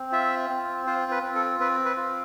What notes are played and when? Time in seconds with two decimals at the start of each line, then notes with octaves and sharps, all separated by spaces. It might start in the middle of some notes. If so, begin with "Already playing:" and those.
Already playing: C4
0.12 F4 E5
0.50 C4
0.87 F4 C5
1.12 B4
1.23 C4
1.35 A4
1.60 C4 B4
1.85 B4
1.97 F4